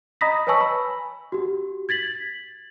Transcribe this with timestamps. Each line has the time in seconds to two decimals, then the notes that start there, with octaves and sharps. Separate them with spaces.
0.21 D#5 A#5 B5 D#6 A#6 B6
0.47 B4 C#5 G#5 A5 C#6 E6
0.61 B5
1.32 F#4 G4
1.89 G#6 A6 B6 F#7